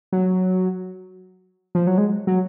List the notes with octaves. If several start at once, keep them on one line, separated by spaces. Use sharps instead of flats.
F#3
F3
F#3
G#3
F#3